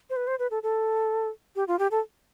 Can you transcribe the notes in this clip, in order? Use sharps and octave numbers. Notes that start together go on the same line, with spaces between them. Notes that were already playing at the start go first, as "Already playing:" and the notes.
C5
B4
C5
B4
A4
A4
G4
F4
G4
A4